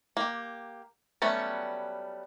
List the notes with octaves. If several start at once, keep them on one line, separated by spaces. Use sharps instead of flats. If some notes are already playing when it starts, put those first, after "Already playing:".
A#3 G4
F#3 G3 A3 B3 C#4